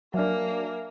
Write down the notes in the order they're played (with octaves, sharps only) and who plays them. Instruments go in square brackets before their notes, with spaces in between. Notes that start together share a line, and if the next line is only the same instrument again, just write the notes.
[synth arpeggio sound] F#3 D4 [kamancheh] A#3 A#4 [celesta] E5 G#5 F6